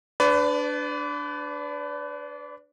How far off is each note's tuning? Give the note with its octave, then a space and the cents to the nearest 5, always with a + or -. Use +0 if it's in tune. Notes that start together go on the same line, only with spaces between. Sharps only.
D4 +0 B4 +25 D5 -30